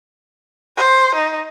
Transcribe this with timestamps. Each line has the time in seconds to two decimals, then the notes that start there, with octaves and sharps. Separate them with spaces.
0.77 C5
1.15 D#4